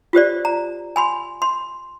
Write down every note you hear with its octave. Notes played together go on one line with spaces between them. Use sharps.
F4 G4 C5 D5
A#5
G#5 B5 C6
C6